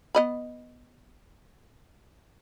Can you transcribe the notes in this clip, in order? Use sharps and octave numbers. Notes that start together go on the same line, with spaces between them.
B3 D#5 B5